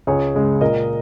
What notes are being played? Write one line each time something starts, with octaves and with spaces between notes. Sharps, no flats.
C#2 G#4 C#5
C#3 G#3
A#2 A#4 D#5